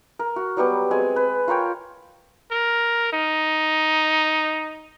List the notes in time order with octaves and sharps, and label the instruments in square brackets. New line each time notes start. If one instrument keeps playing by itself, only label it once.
[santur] A#4
F#4
F#3 G3 B3 G4
G#3 C4 G#5
B4
F4 A#4 C#5 G5
[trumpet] A#4
D#4